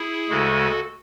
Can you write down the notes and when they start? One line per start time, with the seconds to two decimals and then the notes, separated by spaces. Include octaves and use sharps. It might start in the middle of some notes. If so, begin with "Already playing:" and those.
Already playing: E4 G#4
0.29 D2 C#3 G#3 F#4 A4